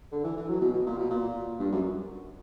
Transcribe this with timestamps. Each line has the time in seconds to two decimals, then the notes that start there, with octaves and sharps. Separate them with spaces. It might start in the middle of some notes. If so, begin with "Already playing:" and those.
0.12 D3
0.24 E3
0.37 E3
0.49 F#3
0.61 B2
0.73 B2
0.86 A#2
0.98 B2
1.10 A#2
1.59 G2
1.72 F#2